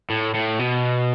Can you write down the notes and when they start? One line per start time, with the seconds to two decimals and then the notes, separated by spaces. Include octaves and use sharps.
0.10 A2
0.35 A2
0.59 B2